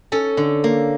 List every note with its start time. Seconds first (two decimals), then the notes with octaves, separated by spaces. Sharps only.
0.12 C#4 A4
0.37 D3
0.64 A#3